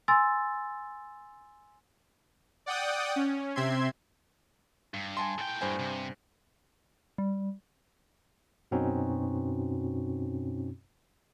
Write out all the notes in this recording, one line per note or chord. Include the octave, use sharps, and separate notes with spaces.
G#5 C6 E6 A6
D5 F#5 G5 D#6
C#4
C3 C4 E5 C6 G#6
G2
G#5 A5 C6
A2 G5
G2 C5 G#5
C3
G3
F#2 B2 C4 C#4 D#4 F#4